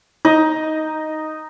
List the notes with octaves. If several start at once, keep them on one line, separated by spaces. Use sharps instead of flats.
D#4 D#5